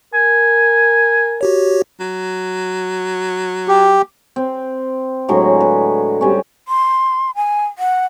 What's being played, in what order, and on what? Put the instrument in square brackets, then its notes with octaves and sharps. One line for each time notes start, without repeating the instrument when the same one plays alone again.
[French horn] A#4 [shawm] G#5
[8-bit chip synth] F#4 G4 C#5
[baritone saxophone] F#3
[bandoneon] G4
[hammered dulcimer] C4
A2 D3 F#3 G#3
B4
G3 C4 C#4
[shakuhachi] C6
G#5
F#5